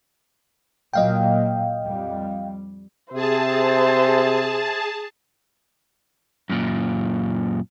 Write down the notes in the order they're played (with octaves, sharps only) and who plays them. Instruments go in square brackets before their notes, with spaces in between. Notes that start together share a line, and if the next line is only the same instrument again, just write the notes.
[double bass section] A#2 F#3 A#3 [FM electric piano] D#5 F5 G5
[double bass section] F2 G3
[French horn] C3 [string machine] G#4 A5 [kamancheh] C5 E5
[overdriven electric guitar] F#2 A#2